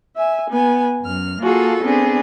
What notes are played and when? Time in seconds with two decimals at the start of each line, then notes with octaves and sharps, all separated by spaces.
0.15 E5 G#5
0.51 B3 G#5
1.02 F#2 F6
1.41 A#3 F4 F#4 G#4 A4
1.83 B3 C4 D4 G#4